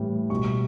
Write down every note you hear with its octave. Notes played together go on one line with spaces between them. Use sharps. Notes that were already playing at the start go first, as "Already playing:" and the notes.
Already playing: A2 E3 G3
B2 G3 C#6